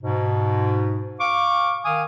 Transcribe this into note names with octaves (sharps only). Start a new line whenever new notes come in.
G#2 B2
F5 C#6 D6
D#3 F5 G#5 D6 D#6